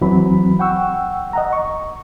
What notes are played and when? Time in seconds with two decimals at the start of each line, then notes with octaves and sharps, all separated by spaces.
0.01 E2 E3 F#3 C4 B5
0.59 F#5 G5 C#6 E6
1.33 D#5 F#5 A#5
1.53 C#6